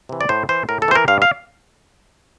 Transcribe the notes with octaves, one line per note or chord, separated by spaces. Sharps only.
C3 E3
D5
A2 C5
E3 C5
A2 A#4
A4
E3 C5
A#4
G2 F5
F5